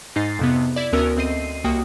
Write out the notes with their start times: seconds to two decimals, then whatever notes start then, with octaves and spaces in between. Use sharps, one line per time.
0.16 G#2 D#4 A6 C7
0.39 F2 C3 B3
0.76 E4 D5
0.93 D2 B3 C#4 F#4 A#4 E6
1.17 D2 C4 D#5 C7 D#7
1.64 C2 A#3 F#4 G5 D#6